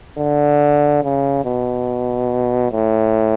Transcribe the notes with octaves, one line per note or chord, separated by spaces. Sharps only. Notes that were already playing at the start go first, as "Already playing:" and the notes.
D3
C#3
B2
A2